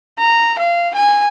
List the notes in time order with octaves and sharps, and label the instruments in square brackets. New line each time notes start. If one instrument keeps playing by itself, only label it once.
[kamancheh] A#5
F5
G#5